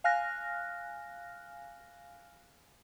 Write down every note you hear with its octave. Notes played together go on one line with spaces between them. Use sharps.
F5 G#5 F6 F#6 A#6